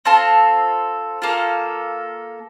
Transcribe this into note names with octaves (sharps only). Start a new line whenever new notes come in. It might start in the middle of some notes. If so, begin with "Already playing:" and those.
C4 F4 A4 A5
A#3 F4 A4